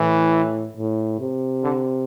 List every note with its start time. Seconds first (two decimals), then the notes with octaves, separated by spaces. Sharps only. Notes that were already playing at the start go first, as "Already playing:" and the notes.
Already playing: A2 E3
0.77 A2
1.20 C3
1.63 D3